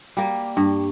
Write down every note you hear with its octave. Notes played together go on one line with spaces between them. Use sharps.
G3 A#3
G2